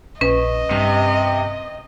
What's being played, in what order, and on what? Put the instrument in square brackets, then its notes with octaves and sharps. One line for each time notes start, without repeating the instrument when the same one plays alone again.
[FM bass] A#1 [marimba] C#4 B4 [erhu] D#5
[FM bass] G2 [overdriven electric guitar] C3